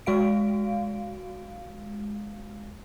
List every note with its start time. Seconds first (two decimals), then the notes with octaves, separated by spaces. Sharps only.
0.06 G#3 F#4 F5 D7